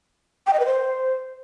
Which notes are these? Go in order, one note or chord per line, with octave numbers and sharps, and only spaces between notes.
G5
D#5
B4
C5